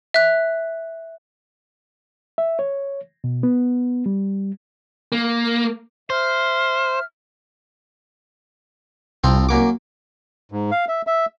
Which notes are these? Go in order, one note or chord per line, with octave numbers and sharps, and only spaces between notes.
E5 F#6
E5
C#5
B2
B3
G3
A#3
C5 E5 F6
C2 F3 C4
F#2 A#3 D6
G#2
F5
E5
E5